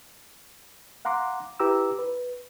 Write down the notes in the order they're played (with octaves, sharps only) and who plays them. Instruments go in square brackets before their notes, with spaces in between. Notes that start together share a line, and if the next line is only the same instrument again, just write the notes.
[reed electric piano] F5 F#5 A#5 C6 D6
E4 G4 B4 A#5 D6 E6
B4